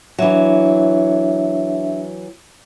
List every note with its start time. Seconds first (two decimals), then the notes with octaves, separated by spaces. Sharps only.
0.19 E3 F#3 D4 E5